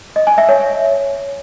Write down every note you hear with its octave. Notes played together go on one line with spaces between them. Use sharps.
D#5
G#5
E5
C#5